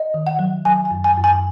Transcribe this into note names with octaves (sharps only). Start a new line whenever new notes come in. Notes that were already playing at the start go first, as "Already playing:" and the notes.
Already playing: D#5
D#3
F#5
F#3
F#3 G#5
G#5
F#2
G#5
F#2
G#5